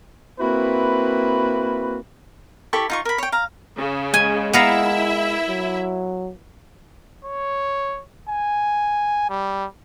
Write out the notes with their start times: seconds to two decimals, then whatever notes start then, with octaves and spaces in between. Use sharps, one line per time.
0.40 A#3 C4 E4 F#4 B4
2.73 E4 G4 A4 C#6
2.90 D#4 F4 C#6
3.05 A#4 B5
3.18 C#5 G5
3.32 F5 A#5
3.76 C#3
4.14 G#3 G#5
4.53 B3 E4 A#4 E5 F5
5.48 F#3
7.25 C#5
8.29 G#5
9.30 G3